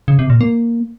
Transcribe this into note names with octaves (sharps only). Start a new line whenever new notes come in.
C#3
C3
A#2
A#3